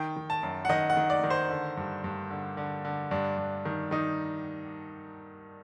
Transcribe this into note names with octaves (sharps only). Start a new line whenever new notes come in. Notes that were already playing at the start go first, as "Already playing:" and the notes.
Already playing: D#3 G5
D#3
A5
F#2
F#5
D#3 D#5
F#5
D#3
D5
D#3
C5
D3
G2
G2
D3
D3
D3
G2 D4
G2
D#3
D#3 D#4